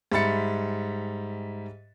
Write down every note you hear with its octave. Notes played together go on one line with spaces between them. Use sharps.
G#2 G3 E5 B5 A6 C#7